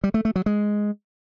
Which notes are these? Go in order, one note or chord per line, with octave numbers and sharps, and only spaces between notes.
G3
A3
A3
F#3
G#3